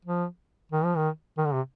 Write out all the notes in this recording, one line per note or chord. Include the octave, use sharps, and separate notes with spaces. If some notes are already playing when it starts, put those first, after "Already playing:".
F3
D#3
F3
D#3
D#3
D3
C3